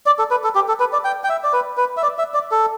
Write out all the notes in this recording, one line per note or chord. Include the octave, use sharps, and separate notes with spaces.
D5
A4
B4
A4
G4
A4
B4
D5
G5
G5
E5
D5
B4
B4
E5
D5
E5
D5
A4